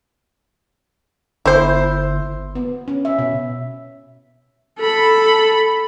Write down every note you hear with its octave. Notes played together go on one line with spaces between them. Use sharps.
G1 E4 C5
B3
C#4
E5
B2
A4 B5